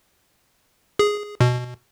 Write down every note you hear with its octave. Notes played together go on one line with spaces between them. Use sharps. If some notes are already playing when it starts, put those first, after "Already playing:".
G#4
B2